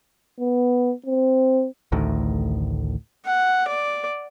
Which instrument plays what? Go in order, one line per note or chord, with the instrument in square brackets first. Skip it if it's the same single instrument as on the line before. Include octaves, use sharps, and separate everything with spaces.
[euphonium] B3
C4
[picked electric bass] A1 D2 A2 D#3
[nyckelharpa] F#5
D5